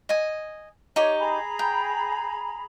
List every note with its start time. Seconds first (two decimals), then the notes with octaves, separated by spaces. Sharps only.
0.09 D#5 G#5
0.96 D#4 G4 C#5 C#6 D6
1.18 G#4 A#5 B5
1.59 G5